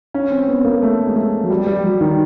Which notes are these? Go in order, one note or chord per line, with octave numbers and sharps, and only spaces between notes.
C#4
C4
B3
A#3
A3
G#3
A3
F#3
G3
G3
F#3
D#3